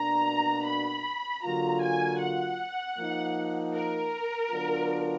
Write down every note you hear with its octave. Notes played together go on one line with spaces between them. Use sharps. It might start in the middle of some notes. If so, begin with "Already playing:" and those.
Already playing: B2 A#3 D4 F#4 A#5
B5
D3 F#3 A#3 F4 A#5
G#5
F#5
F3 A#3 D#4
A#4
D3 F#3 B3 D4 F4